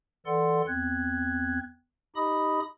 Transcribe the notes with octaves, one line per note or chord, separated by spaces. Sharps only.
E3 A4 D5 F#5 C6
E2 C4 F#6 G#6
D#4 G4 D#5 B5 D#6